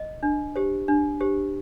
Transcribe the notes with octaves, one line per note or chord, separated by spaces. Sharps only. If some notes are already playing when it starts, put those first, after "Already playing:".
Already playing: D#5
D4
G4 C5
D4
G4 C5